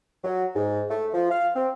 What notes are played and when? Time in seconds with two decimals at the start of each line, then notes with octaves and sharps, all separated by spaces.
0.24 F#3
0.55 G#2
0.91 A3
1.14 F3
1.31 F5
1.56 C4